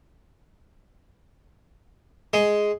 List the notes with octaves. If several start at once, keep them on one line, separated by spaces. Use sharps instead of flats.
G#3